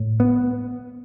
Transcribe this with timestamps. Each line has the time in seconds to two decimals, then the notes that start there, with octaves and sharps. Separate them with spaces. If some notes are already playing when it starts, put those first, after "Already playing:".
Already playing: A2
0.20 B3